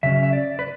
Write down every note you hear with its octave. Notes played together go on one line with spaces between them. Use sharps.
C#3 F#3 C#4 E5
E5
D5
B4